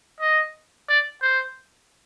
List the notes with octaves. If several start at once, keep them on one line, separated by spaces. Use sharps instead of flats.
D#5
D5
C5